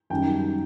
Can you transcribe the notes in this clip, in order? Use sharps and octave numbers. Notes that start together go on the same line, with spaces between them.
F#2 D#3 G3 G5